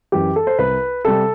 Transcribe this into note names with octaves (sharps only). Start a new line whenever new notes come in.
F#2 E3 G4
A4
C5
C2 B4
C3 G3 A4